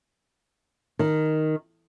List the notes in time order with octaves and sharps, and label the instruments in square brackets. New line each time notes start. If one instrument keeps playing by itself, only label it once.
[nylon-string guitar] D#3